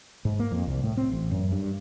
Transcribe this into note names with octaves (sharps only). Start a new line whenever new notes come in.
G#2
A#3
F2
C2
A2
C4
A1
F#2
G2